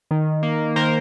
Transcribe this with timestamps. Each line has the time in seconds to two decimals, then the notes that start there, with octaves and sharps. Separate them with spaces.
0.11 D#3
0.43 A#3
0.76 D#3 A#4 C5